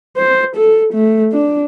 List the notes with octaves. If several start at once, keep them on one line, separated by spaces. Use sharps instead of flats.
C5
A4
A3
D4